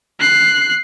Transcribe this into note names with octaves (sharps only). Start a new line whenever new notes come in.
F#6 C7